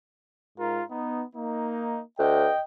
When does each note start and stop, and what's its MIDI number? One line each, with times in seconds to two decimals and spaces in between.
0.58 0.82 44
0.58 0.82 65
0.58 0.82 70
0.90 1.23 59
0.90 1.23 63
1.36 2.01 58
1.36 2.01 63
2.19 2.48 38
2.19 2.62 75
2.19 2.62 79